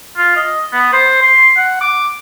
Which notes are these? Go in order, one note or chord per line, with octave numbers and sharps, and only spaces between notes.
F4
D#5
B3
C5
C6
F#5
D6